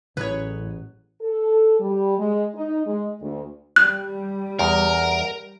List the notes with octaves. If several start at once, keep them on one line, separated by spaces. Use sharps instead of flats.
A1 A2 F#3 G#4 B4 C#5
A4
G3
G#3
D#4
G#3
D2
G3 F#6
E2 A#4